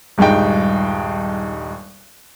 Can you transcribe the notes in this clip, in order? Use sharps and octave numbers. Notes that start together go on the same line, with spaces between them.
D#1 G2 G#3 D#4 G5